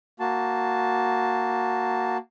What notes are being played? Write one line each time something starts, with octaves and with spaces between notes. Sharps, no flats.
A#3 F#4 A5